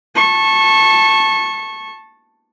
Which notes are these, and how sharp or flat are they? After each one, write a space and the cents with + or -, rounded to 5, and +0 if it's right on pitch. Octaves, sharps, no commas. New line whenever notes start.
A5 +0 C#6 -25